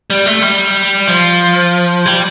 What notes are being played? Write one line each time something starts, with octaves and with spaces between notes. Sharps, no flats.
G3
A3
G3
F3
G3